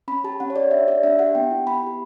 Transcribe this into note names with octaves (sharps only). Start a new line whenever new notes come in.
C#4 B5
G4 A5
C#4 F#5
C#5
G4 D5
D4 E5
G4 D5
D4 E5
G4 F#5
B3 G5
E4 G4
B3 B5
E4 G4